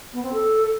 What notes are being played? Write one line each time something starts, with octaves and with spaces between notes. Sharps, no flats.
B3
C4
A4